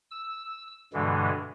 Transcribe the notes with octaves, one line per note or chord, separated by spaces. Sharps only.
E6
G2 B2 D3 E3 G#3